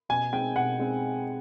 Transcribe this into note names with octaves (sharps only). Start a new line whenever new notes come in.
B2 G#5
G#3 C4 D#4 G5
B2 F#5
G#3 C4 D#4